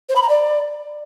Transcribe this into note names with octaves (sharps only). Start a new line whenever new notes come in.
C5
B5
A#5
D5